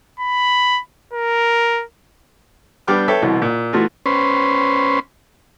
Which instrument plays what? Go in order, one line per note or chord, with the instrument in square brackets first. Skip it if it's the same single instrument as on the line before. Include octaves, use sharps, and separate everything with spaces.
[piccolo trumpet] B5
A#4
[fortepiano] G3 B3 D4 G5 D6 F6
A4 B4 C#5 E5 G5
C2 B2 E3
A#2
E3 A3 B3 F4 F#4
[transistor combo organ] C#4 B4 C5